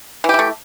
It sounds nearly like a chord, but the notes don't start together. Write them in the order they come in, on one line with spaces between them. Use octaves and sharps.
E3 G4 E4 A3